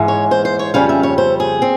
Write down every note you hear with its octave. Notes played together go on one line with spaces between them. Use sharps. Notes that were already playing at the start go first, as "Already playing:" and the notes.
Already playing: G#2 E3 G#3
C#5
C5
C5
C#5
F2 C#3 G3 C#4 F5
E5
C#5
C5
G#4
C4